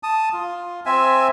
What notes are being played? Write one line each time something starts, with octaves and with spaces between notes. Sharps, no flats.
A5 D#6
F4
C4 E5 G#5